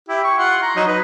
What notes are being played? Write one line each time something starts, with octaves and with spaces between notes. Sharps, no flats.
E4 G4
C#6
F4 F#5 C6
A#5
F#3 D#4
B4